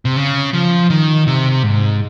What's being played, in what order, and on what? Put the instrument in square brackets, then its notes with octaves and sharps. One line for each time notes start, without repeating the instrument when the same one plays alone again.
[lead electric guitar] C3
C#3
F3
D#3
C3
G#2